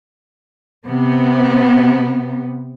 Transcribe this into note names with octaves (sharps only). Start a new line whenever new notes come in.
C3 B3